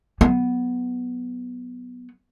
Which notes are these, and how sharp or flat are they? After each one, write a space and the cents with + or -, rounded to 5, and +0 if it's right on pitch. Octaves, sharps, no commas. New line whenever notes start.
F#3 +0 B3 +0